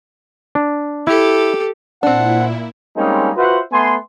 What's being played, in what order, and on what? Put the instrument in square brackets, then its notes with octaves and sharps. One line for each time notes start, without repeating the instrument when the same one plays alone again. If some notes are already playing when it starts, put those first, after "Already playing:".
[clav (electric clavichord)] D4
[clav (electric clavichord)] E4 [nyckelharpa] G4 A4
[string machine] A#2 E4 [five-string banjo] C4 D4 [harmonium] F#5
[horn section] G3 G#3 A#3 C4 C#4 D#4
F4 F#4 B4 C5 E5 F#5
A3 B3 G#5 C6